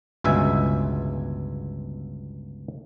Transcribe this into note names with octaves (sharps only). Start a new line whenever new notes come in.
G1 C#2 B2 E5 G#5